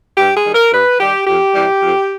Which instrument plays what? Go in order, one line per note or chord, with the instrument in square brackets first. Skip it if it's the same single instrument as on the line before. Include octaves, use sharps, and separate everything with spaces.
[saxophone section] G2 G4
G#4
D#3 G3
A#4
G2 B4
D#3 G3 G4
F2 G4
C3 E3 G3
F2